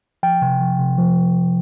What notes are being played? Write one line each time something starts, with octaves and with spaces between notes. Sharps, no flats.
F3 G5
C3
F3
C3
F3